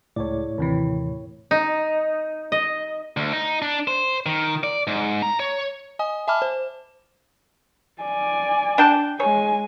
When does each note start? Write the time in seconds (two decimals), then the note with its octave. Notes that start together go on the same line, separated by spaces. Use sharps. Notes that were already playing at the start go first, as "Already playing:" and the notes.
0.16 C#2 A2 C#5 D5
0.58 D#2 C3 E3
1.51 D#4
2.52 D#5
3.17 D2
3.33 D#4
3.62 D4
3.88 C5
4.26 D#3
4.63 D5
4.87 G#2
5.22 A#5
5.40 C#5
5.99 D#5 G#5 D#6
6.28 E5 G#5 A5 B5 D6 F6
6.42 C5
8.02 D5 G#5
8.78 D4 G5 A5
9.20 G#3 C#5 G#5